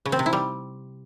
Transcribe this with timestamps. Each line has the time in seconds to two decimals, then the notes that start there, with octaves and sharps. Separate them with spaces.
0.06 C#3
0.12 C4
0.19 C3
0.26 E4
0.33 G3